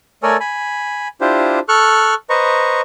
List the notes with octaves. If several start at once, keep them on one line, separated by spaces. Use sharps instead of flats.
A3 A4 A#4 C#5 D5 G#5
G#5 B5
D4 E4 F4 G4 C5
A4 C#6 F6 F#6
B4 C5 D#5 A#5 C#6